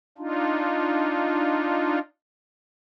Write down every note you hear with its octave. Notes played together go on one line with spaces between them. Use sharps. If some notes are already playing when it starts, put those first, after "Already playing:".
D4 D#4 F4